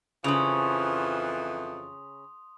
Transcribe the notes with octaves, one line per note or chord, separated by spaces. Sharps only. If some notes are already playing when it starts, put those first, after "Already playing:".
F2 C#3 E3 F3 C#4 C6 D#6 F7